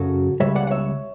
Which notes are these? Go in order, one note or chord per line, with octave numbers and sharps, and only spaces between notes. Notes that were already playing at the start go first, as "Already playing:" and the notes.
Already playing: F#2 C#3 F#3 F#4 A4
C#2 C#3 G3 C#5 E5
D5 F#5
F#5
C#5 E5